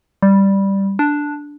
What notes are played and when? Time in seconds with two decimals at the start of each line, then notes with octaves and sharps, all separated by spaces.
0.22 G3
0.99 D4